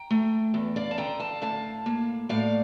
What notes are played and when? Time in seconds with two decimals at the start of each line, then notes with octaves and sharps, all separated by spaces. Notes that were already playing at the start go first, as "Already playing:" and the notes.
Already playing: G5 A#5
0.11 A3
0.54 E2
0.76 D5 F5
0.91 A5
0.98 D3 G5 A#5
1.20 F5 A5
1.42 A2 F5 A5
1.86 A#3
2.29 A2 D5 F5